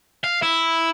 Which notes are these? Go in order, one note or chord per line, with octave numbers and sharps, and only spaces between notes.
F5
E4